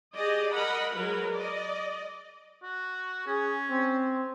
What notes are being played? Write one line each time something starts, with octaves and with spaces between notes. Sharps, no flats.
G4 G#4 D5 D#5
A#4 D#5 F#5 B5
F#3 G#3 A#4 B4
D5 D#5
F#4
C#4 G#4
C4